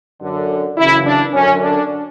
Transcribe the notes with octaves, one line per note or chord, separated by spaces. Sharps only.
F#2 D3
F#2 C#3 E3 E4
D4
F#2 D3 C#4
D4